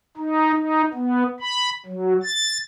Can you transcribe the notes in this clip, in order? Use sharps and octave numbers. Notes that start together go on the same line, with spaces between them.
D#4
D#4
B3
B5
F#3
A6